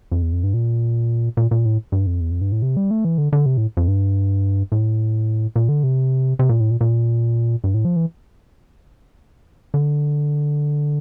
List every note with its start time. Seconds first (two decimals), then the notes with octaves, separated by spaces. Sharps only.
0.12 F2
0.22 E2
0.32 F2
0.44 G2
0.54 A#2
1.37 A#2
1.51 A#2
1.65 A2
1.92 G2
2.07 F2
2.21 E2
2.31 F2
2.41 G2
2.52 A2
2.62 C3
2.77 G3
2.91 A3
3.05 E3
3.18 D3
3.33 D3
3.46 C3
3.57 A2
3.77 F2
3.88 G2
4.72 A2
5.56 A#2
5.69 D3
5.83 C3
6.39 C3
6.49 A#2
6.60 A2
6.70 A#2
6.81 A#2
7.64 G2
7.74 A2
7.85 F3
7.96 E3
9.74 D3